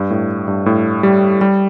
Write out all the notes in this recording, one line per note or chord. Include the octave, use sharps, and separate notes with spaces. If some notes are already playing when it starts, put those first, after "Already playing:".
Already playing: G2
A2
G2
A2
G3
G3